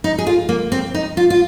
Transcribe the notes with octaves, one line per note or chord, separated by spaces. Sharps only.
D#4
G#4
F4
A#3
C4
D#4
F4
F4